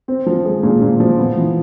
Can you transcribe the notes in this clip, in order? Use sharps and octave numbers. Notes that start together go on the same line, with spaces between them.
C4
F3
G#3
A#2
A#2
F3
B3
E3